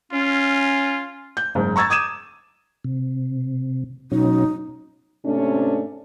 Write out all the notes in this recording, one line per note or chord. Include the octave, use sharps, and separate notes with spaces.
C#4 F4
G6
F#1 G#2
A#5 C#6 E6 G#6 A6
D6 D#6 G#6 D#7 E7
C3
B2 F#3 C#4 D#4
G#2 C3 A3 C#4 D4